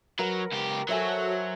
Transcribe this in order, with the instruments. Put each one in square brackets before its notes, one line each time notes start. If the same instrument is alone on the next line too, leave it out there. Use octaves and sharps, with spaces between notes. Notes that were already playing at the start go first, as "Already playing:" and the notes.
[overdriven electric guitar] F#3 [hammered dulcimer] A#4 B4 F#5
[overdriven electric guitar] C#2 G4
[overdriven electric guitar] F#3 [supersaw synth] F#4 A4 C#5 [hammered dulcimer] C5 E5 G#5